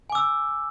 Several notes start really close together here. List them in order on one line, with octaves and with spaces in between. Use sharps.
G#5 D6 E6